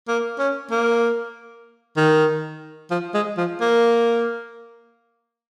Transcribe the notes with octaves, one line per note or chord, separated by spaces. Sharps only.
A#3
C#4
A#3
D#3
F3
G#3
F3
A#3